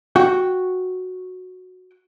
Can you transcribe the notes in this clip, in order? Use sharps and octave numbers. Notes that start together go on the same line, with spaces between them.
F#4 F#5 G5